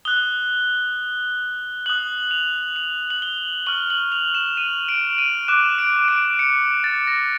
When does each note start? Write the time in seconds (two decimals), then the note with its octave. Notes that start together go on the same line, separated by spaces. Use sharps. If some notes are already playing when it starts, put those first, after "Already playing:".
0.05 D#6 F#6 G7
1.86 D#6 F#6 F#7
2.31 F7
2.76 F#7
3.10 F#7
3.22 G7
3.67 C#6 F6 F#7
3.90 F#7
4.12 F7
4.34 E7
4.57 D#7
4.89 D7
5.18 D#7
5.48 D6 F#6 E7
5.78 D7
6.08 D7
6.39 C#7
6.84 A6
7.07 A#6